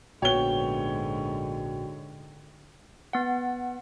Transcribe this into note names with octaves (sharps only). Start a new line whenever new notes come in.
A#1 G#2 D3 B3 F#4 C#5 G5 G7
B3 F#5